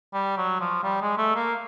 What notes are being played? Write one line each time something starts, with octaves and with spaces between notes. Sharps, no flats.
G3
F#3
F3
G3
G#3
A3
A#3